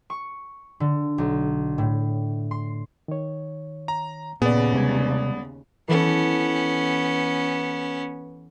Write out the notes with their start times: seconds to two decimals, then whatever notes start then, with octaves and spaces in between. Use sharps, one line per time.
0.10 C#6
0.80 D3
1.18 B1
1.78 A2
2.51 C6
3.08 D#3 C#5
3.88 A#5
4.42 D#2 A#2 C#3 B3 G#4 D5
4.74 C3 G3 G#3 G#6
5.88 E3 B3 C#4 A4